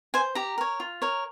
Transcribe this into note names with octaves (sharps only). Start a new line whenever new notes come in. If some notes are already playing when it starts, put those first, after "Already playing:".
C5 G#5
G4 A#5
A#4 C#5
F4
A#4 C#5